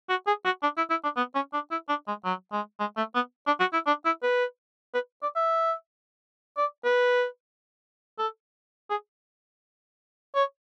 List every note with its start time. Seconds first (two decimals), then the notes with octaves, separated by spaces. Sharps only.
0.09 F#4
0.27 G#4
0.45 F#4
0.63 D4
0.77 E4
0.90 E4
1.04 D4
1.17 B3
1.35 C#4
1.53 D4
1.71 E4
1.89 D4
2.08 G#3
2.25 F#3
2.52 G#3
2.80 G#3
2.97 A3
3.15 B3
3.47 D4
3.60 F#4
3.73 E4
3.87 D4
4.05 E4
4.23 B4
4.94 B4
5.22 D5
5.36 E5
6.57 D5
6.84 B4
8.19 A4
8.90 G#4
10.35 C#5